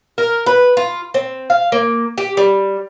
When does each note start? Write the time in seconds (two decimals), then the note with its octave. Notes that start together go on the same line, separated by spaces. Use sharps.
0.18 A#4
0.46 B4
0.77 F4
1.14 C4
1.50 F5
1.72 A#3
2.18 G4
2.37 G3